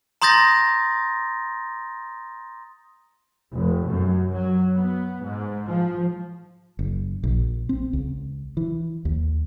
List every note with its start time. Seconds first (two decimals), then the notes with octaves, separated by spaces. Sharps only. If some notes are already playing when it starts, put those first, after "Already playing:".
0.22 A#5 C6 D#6 G6 A6 A#6
3.53 F1
3.88 F#2
4.33 F#3
4.78 B3
5.24 G#2
5.68 F3
6.79 F#1
7.23 A#1
7.69 C4
7.93 C#2
8.57 E3
9.05 D#2